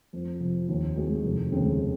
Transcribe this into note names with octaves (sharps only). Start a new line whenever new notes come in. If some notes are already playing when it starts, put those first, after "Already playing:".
F2
C3 F3
D#2
D#3 G#3 C4 F#4
F1
D#2 C#3 G#3 C4